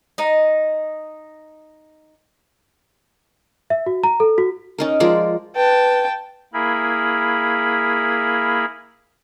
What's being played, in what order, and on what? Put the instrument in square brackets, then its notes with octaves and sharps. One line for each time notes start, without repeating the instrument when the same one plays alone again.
[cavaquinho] D#4 D#5
[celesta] E5
F#4
A#5
A4
F#4
[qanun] C#4 D#4 A#4
F3 G#3 A#4 D5
[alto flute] B4 [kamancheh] G5 A5
[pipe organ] A#3 E4 G#4 A#4 B5